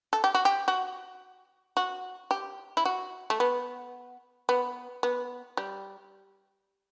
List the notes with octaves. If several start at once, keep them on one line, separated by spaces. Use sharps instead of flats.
A4
G4
F#4
G4
F#4
F#4
G4
E4
F#4
A3
B3
B3
B3
G3